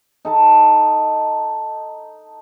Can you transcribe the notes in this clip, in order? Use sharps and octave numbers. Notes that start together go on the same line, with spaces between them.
D#4 A4 A5